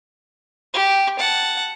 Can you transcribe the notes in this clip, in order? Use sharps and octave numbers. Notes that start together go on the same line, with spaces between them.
G4
F#5 A5